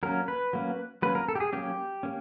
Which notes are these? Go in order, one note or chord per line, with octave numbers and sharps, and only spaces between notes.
F#3 A#3 C#4 A#4
B4
F#3 A#3 C#4
F#3 A#3 C#4 B4
A#4
A4
G4
G#4
F#3 A#3 C#4 G4
A#3 C#4